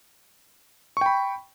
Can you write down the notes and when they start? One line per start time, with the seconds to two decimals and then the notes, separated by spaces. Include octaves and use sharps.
0.97 C#6
1.01 G5
1.06 B5